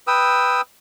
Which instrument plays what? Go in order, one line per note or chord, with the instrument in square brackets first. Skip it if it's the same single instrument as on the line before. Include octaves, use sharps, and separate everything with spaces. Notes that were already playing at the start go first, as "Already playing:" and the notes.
[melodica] B4 G5 D#6 E6